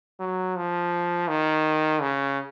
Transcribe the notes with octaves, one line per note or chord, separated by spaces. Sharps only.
F#3
F3
D#3
C#3